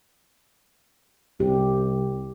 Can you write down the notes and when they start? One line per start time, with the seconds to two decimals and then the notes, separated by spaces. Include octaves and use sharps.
1.40 C2 G4